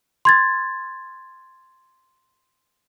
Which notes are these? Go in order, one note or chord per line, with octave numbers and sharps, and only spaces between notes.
C6 G#6 A6